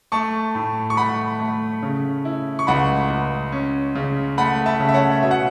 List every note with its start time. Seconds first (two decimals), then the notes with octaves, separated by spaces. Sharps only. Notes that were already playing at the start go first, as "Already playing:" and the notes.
0.12 A3 A5 C#6
0.55 A2
0.90 C#6
0.97 A3 F#5 B5
1.40 A3
1.83 C#3
2.25 E4
2.59 C#6
2.67 C#2 F#5 B5
3.10 C#2
3.52 C#4
3.95 C#3
4.38 A3 F#5 B5
4.66 E5 A5
4.80 C#3
4.89 E5
4.94 C#5 F#5
5.23 B2 E5
5.31 F#5